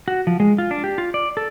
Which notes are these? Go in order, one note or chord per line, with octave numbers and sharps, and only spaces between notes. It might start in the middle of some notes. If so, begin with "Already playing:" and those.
F#4
F3
G#3
F4
D4
G4
F4
D5
A4